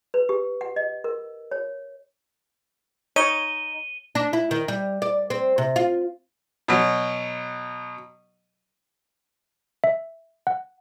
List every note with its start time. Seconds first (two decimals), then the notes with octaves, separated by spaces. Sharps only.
0.14 B4
0.29 G4
0.61 F#5
0.76 D#5
1.04 A#4
1.51 C#5
3.16 D#4 C#5 D#7 G7
4.15 D4
4.33 E4
4.51 D#3
4.68 G3
5.02 D5
5.30 C4
5.58 C3
5.76 F4
6.68 B2 F#3
9.84 E5
10.47 F#5